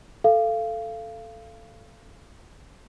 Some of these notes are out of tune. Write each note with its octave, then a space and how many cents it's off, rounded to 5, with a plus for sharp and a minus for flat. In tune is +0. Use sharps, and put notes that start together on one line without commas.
A4 +0 F5 -25